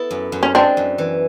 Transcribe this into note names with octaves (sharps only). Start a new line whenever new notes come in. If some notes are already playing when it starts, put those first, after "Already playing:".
Already playing: B3 E4 A4
F#2
F#2
C#4
G#3 C4 D4
F#2
E3